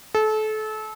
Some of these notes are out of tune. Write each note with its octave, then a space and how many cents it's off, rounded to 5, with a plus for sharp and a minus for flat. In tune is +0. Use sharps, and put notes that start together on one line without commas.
A4 -30